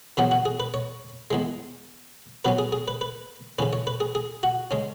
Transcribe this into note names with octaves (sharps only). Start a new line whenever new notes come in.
E2 C#3 F#3 B3 F#4
F#4
G#4
B4
C#5
E2 E3 G#3
B2 F#3 C#4 B4
G#4
G#4
B4
B4
C#3 E3 C#4 B4
C#5
B4
G#4
G#4
F#4
C#3 G#3 C#4